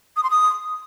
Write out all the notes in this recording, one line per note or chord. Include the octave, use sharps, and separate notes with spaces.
D#6
C6
D#6